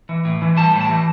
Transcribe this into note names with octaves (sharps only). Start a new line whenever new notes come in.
E3
A2
E3
G3 A5
A2
A5
E3